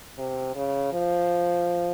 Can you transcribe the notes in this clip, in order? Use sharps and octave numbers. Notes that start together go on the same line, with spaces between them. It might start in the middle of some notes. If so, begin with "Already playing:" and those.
C3
C#3
F3